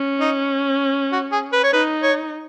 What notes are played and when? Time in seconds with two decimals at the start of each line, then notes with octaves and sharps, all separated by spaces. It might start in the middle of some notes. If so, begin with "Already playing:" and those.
Already playing: C#4
0.20 D#4
1.12 F#4
1.32 G#4
1.53 B4
1.63 C#5
1.72 D#4 B4
2.03 C#5